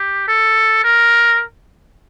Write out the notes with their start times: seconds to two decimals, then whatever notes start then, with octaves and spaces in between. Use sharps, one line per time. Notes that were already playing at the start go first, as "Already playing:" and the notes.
Already playing: G4
0.28 A4
0.84 A#4